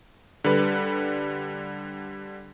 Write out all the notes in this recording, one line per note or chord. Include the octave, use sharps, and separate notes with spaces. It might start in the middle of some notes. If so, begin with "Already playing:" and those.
D3 G3 B4